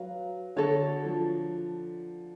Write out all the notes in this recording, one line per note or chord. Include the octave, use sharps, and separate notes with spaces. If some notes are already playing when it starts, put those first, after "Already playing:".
Already playing: F#3 B4 F5
D3 F#4 A4 C#5
F3